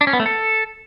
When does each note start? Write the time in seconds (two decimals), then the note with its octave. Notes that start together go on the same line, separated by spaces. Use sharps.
0.01 D4
0.07 C#4
0.13 B3
0.20 A3
0.26 A4